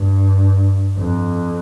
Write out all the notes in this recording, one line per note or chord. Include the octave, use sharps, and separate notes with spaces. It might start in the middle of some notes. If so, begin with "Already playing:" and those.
Already playing: G2
F2